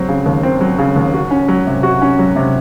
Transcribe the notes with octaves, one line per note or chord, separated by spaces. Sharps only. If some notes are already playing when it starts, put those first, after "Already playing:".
Already playing: F#3 C4
C#3
D#2
C4
F#3
C#3
D#2
F#4
C#4
F#3
C3
F#4
C#4
F#3
C3